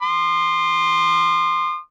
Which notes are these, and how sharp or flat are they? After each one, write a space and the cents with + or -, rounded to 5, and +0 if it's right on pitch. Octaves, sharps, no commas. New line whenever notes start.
C6 +0 D#6 -45